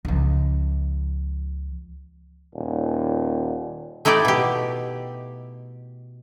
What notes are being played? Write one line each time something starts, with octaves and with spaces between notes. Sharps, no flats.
C#2 F3
D#1
A3 D#4 E4 G4 D5
B2 G4